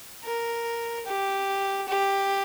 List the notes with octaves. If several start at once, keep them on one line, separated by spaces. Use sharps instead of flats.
A#4
G4
G4